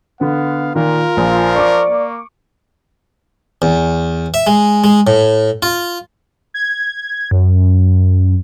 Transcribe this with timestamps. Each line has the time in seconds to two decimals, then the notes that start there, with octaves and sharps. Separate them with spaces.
0.21 D3 B3 F5
0.75 A#2 D#3 F4 A#4
1.17 A#1 F3
1.56 D5 C#6 D6
1.89 A#3
3.62 E2
4.34 E5
4.47 G#3
4.84 G#3
5.07 A2
5.62 F4
6.54 G#6
7.31 F#2